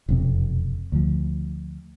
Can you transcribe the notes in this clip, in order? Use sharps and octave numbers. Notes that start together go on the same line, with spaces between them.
E1 F2 C3
D2 F3